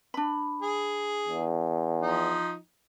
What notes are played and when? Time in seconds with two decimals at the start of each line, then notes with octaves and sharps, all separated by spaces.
0.14 D4 B5
0.62 G#4
1.28 E2
2.02 F3 D#4